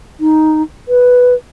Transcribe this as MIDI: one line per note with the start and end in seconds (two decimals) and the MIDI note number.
0.20 0.62 63
0.88 1.34 71